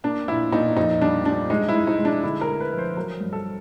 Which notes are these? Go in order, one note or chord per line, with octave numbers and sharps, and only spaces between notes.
A#3 D4
A#2 E4
A#2 D#4
F2 D#4
G3 D4
G3 D4
G#3 D#4
E4
G#3
D#4
G#3
D4
D3 E4
A#4
A3
B4
F3
C5
F#3 A#4
G2
A4